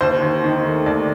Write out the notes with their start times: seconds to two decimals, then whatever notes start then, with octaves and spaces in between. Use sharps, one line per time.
0.01 D#2 C5
0.22 D#2
0.44 D#3
0.65 A3
0.86 D#2 D5